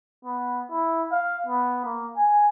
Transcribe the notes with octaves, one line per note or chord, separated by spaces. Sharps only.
B3
E4
F5
B3
A#3
G#5